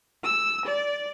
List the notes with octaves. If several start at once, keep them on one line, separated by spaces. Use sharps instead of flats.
E6
D5